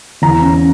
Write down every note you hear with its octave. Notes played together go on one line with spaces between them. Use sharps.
E2 A#5
C#4